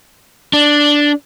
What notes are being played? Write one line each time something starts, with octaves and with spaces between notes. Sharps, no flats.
D4